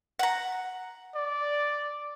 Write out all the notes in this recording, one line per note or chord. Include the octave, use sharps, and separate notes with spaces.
F#5 A#5
D5